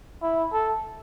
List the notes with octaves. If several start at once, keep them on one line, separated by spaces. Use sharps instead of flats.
E4
A4